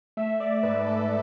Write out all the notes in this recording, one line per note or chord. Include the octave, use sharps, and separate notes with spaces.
A3 E5
D5
G#2 B4
A4